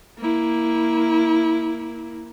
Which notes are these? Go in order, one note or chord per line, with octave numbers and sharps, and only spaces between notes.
A#3 E4